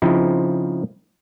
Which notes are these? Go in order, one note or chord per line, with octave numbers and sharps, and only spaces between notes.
C#3 F3 C4 D#4 E4